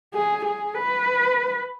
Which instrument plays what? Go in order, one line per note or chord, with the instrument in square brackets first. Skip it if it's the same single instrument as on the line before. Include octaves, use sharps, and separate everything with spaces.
[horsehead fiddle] G#4
G#4
B4